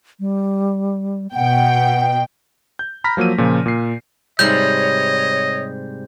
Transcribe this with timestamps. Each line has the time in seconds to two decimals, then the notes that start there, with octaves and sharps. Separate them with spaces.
0.20 G3
1.35 B2 F#5 G5
2.79 G6
3.04 A#5 B5 F6 A#6 B6
3.17 F3 F#3 A#3 E6 D#7
3.38 A#2 C#3 F3
3.66 A#2 C7
4.39 G#2 C3 G3 C#5 D#5 G6